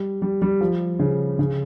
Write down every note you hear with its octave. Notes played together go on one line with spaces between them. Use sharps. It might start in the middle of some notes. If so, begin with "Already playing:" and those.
Already playing: G3
G3
G3
F3
C#3
C#3